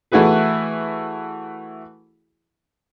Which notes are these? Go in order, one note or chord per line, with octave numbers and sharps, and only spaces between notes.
E3 A3 E4 F#4 G#4 B4